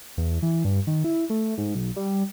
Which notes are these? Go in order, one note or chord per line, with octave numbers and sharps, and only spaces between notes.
E2
E3
G2
D#3
E4
A3
G#2
B1
G3